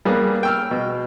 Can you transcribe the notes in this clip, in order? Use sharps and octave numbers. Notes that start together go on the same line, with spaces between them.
G3 A#3 B3 G#4 B4
G5 E6 F6
B2